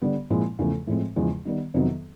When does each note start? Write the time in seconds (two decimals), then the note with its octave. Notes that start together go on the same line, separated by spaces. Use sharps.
0.02 D3 G3 B3
0.30 A#2 F3 G#3 C4 E4
0.59 E2 C#3 F3 A3
0.87 A2 F3 G#3 C4
1.16 E2 C#3 F3 G#3
1.45 D#3 G3 B3
1.74 F2 C3 D#3 F#3 B3